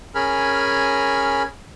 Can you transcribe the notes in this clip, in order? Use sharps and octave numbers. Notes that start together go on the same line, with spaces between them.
C#4 G#4 A#4 G#5 B5 F6